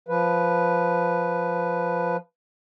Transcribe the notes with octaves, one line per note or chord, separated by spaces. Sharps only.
F3 B4